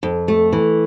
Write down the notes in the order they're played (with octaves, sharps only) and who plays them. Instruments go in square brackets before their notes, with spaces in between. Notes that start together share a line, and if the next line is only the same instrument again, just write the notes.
[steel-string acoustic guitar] F2
A3
E3